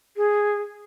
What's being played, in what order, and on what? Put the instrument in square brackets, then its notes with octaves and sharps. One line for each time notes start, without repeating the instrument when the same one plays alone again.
[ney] G#4